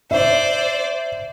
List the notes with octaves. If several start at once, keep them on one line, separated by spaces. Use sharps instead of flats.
C5 D5 E5